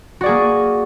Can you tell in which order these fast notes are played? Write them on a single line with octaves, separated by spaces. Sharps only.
F#4 D5 G#4 A#3